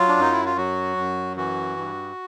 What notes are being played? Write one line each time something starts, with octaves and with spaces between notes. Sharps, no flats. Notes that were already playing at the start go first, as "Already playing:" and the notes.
Already playing: F#3 F4
D4
F#2 D#4
E4
F4
F#3 F#4
F#2
E3 F#4
G2